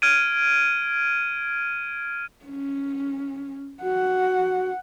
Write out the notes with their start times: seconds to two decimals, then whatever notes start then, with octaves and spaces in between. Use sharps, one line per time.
0.02 F6 G#6 D7 D#7
2.45 C#4
3.83 F#4 F#5